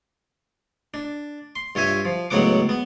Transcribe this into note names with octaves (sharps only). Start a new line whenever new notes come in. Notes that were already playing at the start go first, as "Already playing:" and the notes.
D4
C6
G2 F4 C#5 E5 G#5
F3
C#2 A2 F#3 B3 F#5 D6
B3